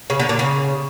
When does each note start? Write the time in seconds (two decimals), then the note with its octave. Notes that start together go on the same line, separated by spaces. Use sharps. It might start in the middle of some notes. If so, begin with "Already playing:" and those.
0.10 C#3
0.20 D3
0.29 A#2
0.39 C#3